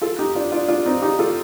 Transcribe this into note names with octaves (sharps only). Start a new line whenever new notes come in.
F4 A4
D#4 G4
D4 F4
D4 F4
D4 F4
C4 D#4
D#4 G4
F4 A4